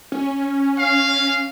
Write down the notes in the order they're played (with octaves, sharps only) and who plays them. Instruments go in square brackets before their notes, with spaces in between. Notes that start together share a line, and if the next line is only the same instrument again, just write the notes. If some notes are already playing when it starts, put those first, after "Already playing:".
[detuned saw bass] C#4
[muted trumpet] F5